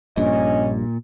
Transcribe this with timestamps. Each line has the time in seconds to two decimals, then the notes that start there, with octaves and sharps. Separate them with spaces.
0.17 A#1 G2 A#2 C#4 D#5